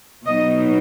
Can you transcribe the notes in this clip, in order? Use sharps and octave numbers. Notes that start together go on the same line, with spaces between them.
B2 F#3 B3 D#4 D#5